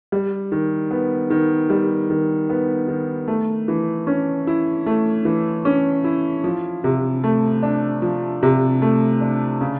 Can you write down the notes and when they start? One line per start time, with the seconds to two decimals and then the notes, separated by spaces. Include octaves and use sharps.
0.12 G3
0.52 D#3
0.91 B3
1.30 D#3
1.70 G3
2.10 D#3
2.50 B3
2.88 D#3
3.28 A3
3.68 E3
4.07 C#4
4.47 E4
4.86 A3
5.25 E3
5.65 C#4
6.04 E4
6.44 F3
6.84 C3
7.24 A3
7.63 D4
8.02 F3
8.43 C3
8.82 A3
9.21 D4
9.61 C#3